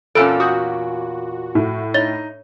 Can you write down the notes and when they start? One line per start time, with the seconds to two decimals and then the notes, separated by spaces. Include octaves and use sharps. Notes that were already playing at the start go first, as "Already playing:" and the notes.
0.15 E2 A#2 C#4 A4 E6 D7
0.40 F#4 D#6 G6
1.55 A2
1.94 D#4 C#5 A6 G7